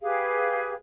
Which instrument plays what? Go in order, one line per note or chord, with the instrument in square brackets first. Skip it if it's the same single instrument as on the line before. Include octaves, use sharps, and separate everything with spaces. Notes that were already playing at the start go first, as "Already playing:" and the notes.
[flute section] G4 G#4 B4 F5